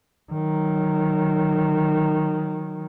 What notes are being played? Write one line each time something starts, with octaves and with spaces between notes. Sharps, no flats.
D#3 F#3